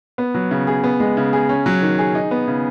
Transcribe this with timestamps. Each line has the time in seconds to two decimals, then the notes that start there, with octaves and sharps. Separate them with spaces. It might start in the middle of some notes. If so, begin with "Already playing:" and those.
0.18 B3
0.35 F#3
0.51 C#3
0.67 G#4
0.84 B3
1.00 G#3
1.17 C#3
1.33 G#4
1.49 C#4
1.66 F#3
1.82 D#3
1.99 G#4
2.15 D#4
2.31 B3
2.48 C#3